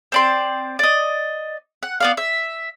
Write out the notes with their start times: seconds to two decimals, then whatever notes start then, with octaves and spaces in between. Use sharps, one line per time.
0.12 C4 D5 C6
0.79 D5 D#5
1.83 F#5
2.00 B3 D5 F5
2.17 E5